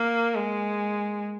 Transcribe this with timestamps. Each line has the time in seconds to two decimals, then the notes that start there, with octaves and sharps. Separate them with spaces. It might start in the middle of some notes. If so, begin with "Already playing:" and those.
Already playing: A#3
0.36 G#3